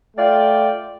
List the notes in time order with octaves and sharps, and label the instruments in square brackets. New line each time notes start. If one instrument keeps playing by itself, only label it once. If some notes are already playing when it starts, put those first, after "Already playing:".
[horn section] A3 F4 D5 G5